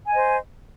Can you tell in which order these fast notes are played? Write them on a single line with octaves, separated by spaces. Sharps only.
G#5 D#5 C5